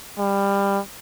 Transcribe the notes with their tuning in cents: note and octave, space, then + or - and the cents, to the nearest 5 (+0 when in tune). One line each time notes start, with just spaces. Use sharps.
G3 +20